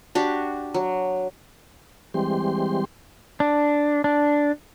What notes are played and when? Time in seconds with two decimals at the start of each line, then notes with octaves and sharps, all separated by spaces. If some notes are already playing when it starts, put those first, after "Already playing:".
0.15 D4 F#4 G4
0.74 F#3
2.14 E3 G3 G#3 C4 G4 C6
3.40 D4
4.04 D4